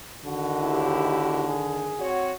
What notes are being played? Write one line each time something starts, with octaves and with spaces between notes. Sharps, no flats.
D3 D#3 F#4
D#2 E4 G4
G#4
C4 F#4 C#5